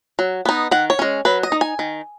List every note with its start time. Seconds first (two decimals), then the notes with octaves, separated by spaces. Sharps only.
0.19 F#3
0.45 B3 D#4
0.71 D#3 F#5
0.90 C#5
0.99 G#3 C#4
1.25 F#3 B4
1.43 D#5
1.52 D#4
1.61 G#5
1.79 D#3